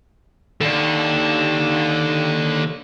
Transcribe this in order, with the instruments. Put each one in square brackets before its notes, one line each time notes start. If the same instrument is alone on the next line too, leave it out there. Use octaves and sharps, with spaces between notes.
[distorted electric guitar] D#2 [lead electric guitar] A4 D5